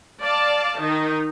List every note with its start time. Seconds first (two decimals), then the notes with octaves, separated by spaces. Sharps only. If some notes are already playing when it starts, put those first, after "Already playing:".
0.22 D5 F5 A5
0.80 D#3 D#4